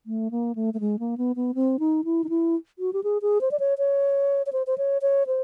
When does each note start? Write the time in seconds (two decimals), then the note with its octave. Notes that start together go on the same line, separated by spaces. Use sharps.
0.06 A3
0.31 A#3
0.55 A3
0.74 A3
0.80 G#3
0.99 A#3
1.18 B3
1.36 B3
1.55 C4
1.79 D#4
2.04 E4
2.24 D#4
2.29 E4
2.79 F#4
2.93 G4
3.04 G#4
3.22 G#4
3.41 C5
3.51 D5
3.60 C#5
3.78 C#5
4.46 C#5
4.53 C5
4.67 C5
4.78 C#5
5.02 C#5
5.27 C5